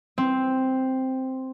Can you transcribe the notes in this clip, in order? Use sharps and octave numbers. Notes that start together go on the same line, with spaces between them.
C4